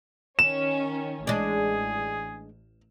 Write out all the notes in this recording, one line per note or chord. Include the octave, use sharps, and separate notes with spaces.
D#3 C#4 E7
A1 G#3 D4 G#4